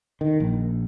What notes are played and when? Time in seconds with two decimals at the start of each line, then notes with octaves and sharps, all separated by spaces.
0.21 D#3
0.40 A#1